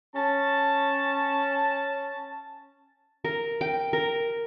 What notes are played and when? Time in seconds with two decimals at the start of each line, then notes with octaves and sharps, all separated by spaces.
0.15 C#4 A5
3.24 A#4
3.61 G5
3.93 A#4